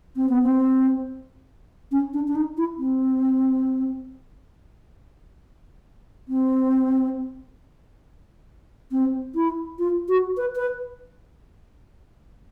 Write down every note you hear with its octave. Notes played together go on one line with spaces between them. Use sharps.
C4
B3
C4
C#4
D4
D4
D#4
E4
C4
C4
C4
E4
F4
F#4
B4
B4